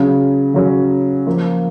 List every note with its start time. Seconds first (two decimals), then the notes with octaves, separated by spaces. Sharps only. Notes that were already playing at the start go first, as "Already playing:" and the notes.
Already playing: C#3 F#3 C#4
0.54 C#3 F#3 C#4
1.27 F3 A#3 F4